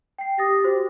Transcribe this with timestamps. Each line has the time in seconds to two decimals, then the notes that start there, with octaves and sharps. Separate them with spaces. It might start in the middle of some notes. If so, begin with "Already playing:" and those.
0.18 G5 C7
0.38 G4 D#6 A6 A#6
0.64 F#4 C5